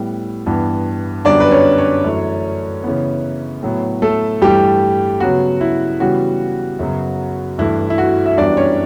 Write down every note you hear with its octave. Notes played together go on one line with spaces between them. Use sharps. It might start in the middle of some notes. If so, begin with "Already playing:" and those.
Already playing: A2 G3 B3
G2 E3 B3
F#2 D3 G3 B3 D4 D5
B4
C#4 C#5
C#4 C#5
F#2 E3 A3
C#3 E3 B3
A2 F#3 B3
A3 A4
G2 E3 G3 A3 G4
C#3 F#3 B3 F#4
E4
C#3 E3 G3 B3 F#4
F#2 C#3 F#3 B3
G2 E3 A3 E4
E4
F#4
E5
F#2 E3 G3 B3 D4 D5
C#4 C#5